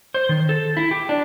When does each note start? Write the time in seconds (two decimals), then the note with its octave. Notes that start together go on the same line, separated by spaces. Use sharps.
0.14 C5
0.29 D#3
0.49 A4
0.77 E4
0.91 G4
1.09 D4